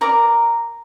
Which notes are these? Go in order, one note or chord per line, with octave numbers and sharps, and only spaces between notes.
A#4 D5 A#5